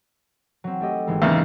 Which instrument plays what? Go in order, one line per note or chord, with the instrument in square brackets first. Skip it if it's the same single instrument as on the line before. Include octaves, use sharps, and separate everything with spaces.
[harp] F#3 C4
A3 G4 D#5
G#1 E3 G#3
[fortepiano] E2 C#3 A#3